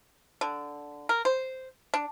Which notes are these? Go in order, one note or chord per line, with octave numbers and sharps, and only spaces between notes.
D3
A#4
C5
D4